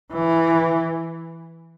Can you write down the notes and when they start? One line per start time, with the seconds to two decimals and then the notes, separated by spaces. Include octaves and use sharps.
0.12 E3